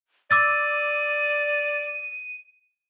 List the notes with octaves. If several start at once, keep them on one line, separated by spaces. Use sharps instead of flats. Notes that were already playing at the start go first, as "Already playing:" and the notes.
D5 D6 E6 A6 D#7